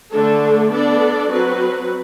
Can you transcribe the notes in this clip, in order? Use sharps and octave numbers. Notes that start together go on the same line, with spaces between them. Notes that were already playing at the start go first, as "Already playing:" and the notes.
D3 A3 D4 A4
B3 D4 A4 D5
F#3 C4 F#4 B4